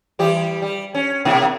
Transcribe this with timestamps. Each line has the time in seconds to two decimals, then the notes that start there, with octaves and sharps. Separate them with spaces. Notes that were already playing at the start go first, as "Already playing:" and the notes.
0.19 E3 G3 G4
0.62 G3
0.95 C#4
1.25 B2 A#3 E4